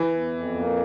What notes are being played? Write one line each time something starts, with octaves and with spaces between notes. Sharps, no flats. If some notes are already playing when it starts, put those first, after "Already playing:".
Already playing: E3
E2
F2
A#3